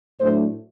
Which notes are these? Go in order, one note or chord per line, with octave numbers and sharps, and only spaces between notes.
A2 F#3 A3 D4 C5